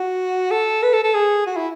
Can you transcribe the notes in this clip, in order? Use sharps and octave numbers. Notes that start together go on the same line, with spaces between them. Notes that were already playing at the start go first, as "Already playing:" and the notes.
Already playing: F#4
A4
B4
A4
A4
G#4
F#4
E4